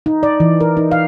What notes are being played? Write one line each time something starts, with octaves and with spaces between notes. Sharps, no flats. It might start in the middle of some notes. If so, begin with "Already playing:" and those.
D#4
D5
E3
A#4
D#4
F5